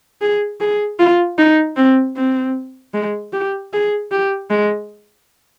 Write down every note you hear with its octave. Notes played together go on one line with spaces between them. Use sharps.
G#4
G#4
F4
D#4
C4
C4
G#3
G4
G#4
G4
G#3